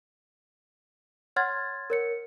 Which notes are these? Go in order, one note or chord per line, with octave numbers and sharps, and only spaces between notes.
C#5 F#5 C6 F6 G#6 A6
A#4 C#5 C#7